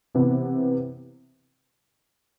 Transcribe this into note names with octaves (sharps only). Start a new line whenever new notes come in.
C3 E3 B3 E4